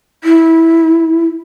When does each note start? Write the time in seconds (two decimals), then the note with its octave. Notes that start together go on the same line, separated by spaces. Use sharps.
0.24 E4